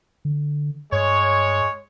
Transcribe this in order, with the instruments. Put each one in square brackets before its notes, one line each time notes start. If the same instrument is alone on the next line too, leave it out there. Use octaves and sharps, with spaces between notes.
[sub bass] D3
[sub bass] G2 [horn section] G#3 C#5